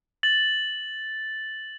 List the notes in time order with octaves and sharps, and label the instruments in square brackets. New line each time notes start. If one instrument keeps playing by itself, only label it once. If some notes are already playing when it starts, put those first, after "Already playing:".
[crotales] A6 F#7